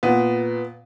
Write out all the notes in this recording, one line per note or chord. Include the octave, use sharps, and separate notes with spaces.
A#2 B3